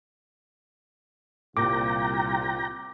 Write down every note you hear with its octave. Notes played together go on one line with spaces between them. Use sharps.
C2 A#2 F4 G5 A#5 D6